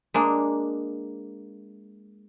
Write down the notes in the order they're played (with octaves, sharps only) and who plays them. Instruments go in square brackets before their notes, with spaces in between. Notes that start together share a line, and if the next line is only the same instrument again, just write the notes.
[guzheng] G#3 A#3 D4